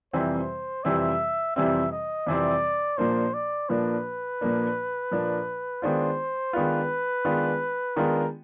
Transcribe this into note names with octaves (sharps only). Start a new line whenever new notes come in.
F2 C3 E3 G3 C4 C5
F2 C3 E3 G3 C4 E5
F2 C3 E3 G3 C4 E5
D#5
F2 C3 E3 G3 C4 D5
A#2 F3 A#3 D4 C5
D5
A#2 F3 A#3 D4 B4
A#2 F3 A#3 D4
A#2 F3 A#3 D4
D#3 G#3 B3 D4 F4 C5
D#3 G#3 B3 D4 F4 B4
D#3 G#3 B3 D4 F4
D#3 G#3 B3 D4 F4 A#4